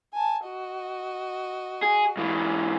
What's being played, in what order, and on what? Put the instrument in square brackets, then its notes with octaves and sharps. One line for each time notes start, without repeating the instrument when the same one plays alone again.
[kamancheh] G#5 A5
F#4 D#5
[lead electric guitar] G#4
G#2 E3